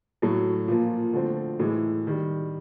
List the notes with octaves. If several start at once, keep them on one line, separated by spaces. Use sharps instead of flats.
A2 F#3 A3
A#2 F3 A#3
D3 F3 A3 C4
A2 E3 G#3
D#3 G3